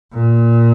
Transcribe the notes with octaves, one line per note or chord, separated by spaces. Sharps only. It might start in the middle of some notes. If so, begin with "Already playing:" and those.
A#2